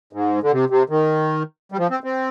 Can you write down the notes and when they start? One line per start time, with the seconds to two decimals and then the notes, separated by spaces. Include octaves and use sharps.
0.13 G#2
0.43 D3
0.52 C3
0.70 C3
0.90 D#3
1.72 G3
1.78 F3
1.90 C4
2.04 C4